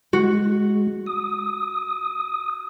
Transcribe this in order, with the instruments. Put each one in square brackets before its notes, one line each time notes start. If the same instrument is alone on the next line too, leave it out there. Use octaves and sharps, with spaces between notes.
[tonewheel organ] G#3 [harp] F#4
[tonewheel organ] D#6